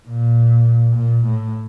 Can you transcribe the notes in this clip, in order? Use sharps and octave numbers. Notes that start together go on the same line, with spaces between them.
A#2
A#2
A2